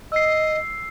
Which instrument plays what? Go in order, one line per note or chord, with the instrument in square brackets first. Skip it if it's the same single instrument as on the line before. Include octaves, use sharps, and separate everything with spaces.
[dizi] D#5 [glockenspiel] E6 C7